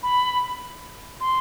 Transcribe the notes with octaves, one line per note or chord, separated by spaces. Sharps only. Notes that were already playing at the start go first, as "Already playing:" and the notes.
B5
C6